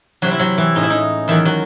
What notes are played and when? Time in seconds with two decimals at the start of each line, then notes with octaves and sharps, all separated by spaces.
0.22 C3 E3 F#3 C4 F#4
0.32 E4
0.39 F#3 F#4
0.58 E3 E4
0.75 A2 G#3 C#4 D#4
0.83 E4
0.90 D#4
1.28 E2 D#3 E3 F#3 E4
1.45 F#3 F#4